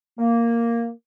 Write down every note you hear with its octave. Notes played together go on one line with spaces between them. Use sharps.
A#3